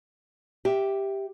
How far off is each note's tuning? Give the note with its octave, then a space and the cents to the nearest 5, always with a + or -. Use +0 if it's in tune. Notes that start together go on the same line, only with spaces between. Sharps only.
G4 +0 E5 +0